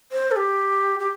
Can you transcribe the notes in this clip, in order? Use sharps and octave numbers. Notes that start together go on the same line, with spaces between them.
C5
A4
G4
G4